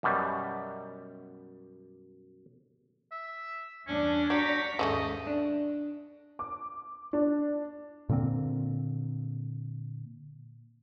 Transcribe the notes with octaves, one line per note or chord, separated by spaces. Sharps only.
F#2 B2 G3
E5
E2 G2 C#4 D4
F#3 G4 A#5 C#6 B6
D#2 G#2 C#3 G#3 A3 D#5
D4
D6
D4
A#2 D3 A#3 C4